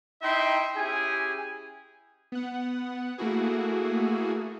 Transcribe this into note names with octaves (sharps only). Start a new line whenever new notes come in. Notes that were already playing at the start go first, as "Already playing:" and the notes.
D#4 E4 D#5 E5 G5 C6
C#4 E4 G4 G#4 G#5
B3 F#5
A3 A#3 E4 F#4 G#4